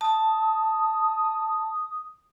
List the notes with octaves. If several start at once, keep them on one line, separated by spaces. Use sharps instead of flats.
A5 D#6